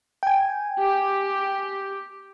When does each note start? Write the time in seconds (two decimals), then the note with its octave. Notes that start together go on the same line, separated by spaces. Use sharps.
0.23 G5 G#5
0.80 G4